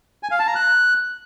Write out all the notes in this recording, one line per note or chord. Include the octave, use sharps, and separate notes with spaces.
G#5
F5
A5
A#5
F#6